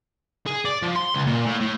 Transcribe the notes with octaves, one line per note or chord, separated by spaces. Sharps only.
G#4
D5
F3
C6
C#2
A#2
A2
A2